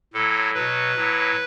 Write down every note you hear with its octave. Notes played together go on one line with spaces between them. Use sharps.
A2 F#3 A4
B2 F#3 B4
A2 F#3